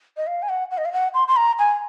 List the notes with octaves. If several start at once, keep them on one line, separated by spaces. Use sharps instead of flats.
D#5
F5
G#5
F#5
F#5
D#5
F5
F#5
C6
C6
A#5
G#5